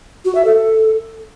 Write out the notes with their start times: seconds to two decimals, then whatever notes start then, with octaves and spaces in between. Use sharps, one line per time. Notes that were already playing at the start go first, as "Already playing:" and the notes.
0.25 F#4
0.35 E5
0.45 A4